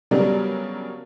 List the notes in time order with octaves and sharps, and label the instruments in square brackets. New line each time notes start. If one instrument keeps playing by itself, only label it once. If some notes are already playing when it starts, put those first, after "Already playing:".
[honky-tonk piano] C#3 F#3 G3 B3 D4 A#4